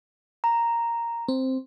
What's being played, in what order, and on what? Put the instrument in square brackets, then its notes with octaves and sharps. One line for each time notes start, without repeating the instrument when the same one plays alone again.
[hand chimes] A#5
[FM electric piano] C4